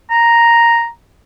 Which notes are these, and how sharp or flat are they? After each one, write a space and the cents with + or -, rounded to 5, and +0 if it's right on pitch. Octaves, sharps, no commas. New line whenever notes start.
A#5 +0